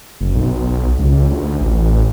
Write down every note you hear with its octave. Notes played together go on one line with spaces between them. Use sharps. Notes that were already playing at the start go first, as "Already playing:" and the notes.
F#1
B1
C#2
D2
A1